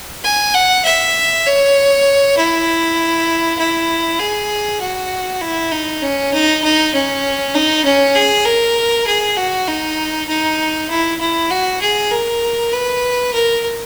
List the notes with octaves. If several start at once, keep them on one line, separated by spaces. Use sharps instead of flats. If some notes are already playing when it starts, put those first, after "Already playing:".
G#5
F#5
E5
C#5
E4
E4
G#4
F#4
E4
D#4
C#4
D#4
D#4
C#4
D#4
C#4
G#4
A#4
G#4
F#4
D#4
D#4
E4
E4
F#4
G#4
A#4
B4
A#4